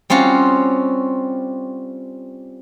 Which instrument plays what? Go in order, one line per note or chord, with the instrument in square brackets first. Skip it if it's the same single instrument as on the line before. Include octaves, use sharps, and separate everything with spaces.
[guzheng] G3 C4 C#4 F4 F#4